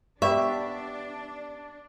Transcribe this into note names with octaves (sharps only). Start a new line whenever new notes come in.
B3 D4 G4 D5 E5 B5 C#6